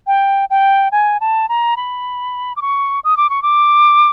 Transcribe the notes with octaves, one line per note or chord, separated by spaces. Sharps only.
G5
G5
G#5
A5
A#5
B5
D6
C#6
D#6
D6
C#6
D6